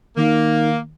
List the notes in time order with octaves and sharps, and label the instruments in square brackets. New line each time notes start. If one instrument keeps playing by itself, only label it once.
[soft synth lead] D#3 [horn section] A#3